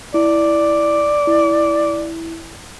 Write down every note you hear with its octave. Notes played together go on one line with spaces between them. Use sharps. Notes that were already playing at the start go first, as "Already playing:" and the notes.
E4 D5
E4